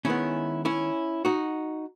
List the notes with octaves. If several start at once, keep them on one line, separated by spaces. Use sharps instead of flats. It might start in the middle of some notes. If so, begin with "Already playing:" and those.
D#3 G#3 B3 C#4 E4
C#4 E4
D#4 F#4